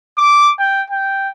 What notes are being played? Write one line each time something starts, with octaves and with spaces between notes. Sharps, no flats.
D6
G5
G5